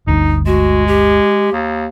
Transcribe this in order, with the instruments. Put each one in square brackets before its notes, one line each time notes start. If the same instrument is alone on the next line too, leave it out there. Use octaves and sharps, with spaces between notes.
[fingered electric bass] G1 D2 G2 [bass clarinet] D#4
[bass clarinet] G#3 [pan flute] F#4
[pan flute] G4
[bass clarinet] D#2